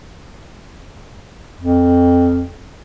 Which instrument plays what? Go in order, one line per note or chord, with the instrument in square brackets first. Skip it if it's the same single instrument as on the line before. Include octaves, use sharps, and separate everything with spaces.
[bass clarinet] F2